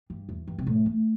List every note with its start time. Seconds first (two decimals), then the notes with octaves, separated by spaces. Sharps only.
0.10 G2
0.29 E2
0.48 G2
0.58 C3
0.67 A2
0.86 A3